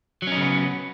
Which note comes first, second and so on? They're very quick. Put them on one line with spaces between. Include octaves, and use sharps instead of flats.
F#3 C#4 D#4 C#3 B3